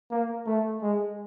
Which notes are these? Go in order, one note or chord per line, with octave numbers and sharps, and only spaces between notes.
A#3
A3
G#3